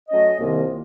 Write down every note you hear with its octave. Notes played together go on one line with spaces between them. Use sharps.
F#3 A3 C#4 A4 D#5
C2 C3 D#3 A#3 F4